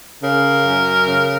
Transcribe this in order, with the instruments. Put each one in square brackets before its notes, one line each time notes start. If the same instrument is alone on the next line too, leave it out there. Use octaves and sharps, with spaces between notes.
[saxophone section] C#3 A#4
F#2
C#3